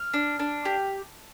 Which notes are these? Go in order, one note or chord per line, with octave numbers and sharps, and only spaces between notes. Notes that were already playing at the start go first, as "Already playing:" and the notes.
Already playing: F6
D4
D4
G4